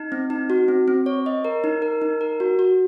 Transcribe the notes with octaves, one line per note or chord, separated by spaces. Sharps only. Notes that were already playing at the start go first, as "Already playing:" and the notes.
Already playing: D#4
C4
D#4
F#4
C4
C4
C#5
D#5
A#4
D#4
A#4
D#4
A#4
F#4
F#4